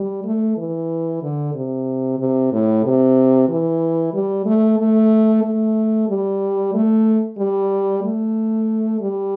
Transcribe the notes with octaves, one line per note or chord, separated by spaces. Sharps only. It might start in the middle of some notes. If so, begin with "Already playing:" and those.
Already playing: G3
A3
E3
D3
C3
C3
A2
C3
E3
G3
A3
A3
A3
G3
A3
G3
A3
G3